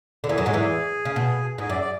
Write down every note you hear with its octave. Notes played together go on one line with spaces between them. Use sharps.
D3
E2 E3 G#4
F#2 F#3
G#2 G#3
E2 E3
C#3
B2
G#2 G#4
F#2 D5
D5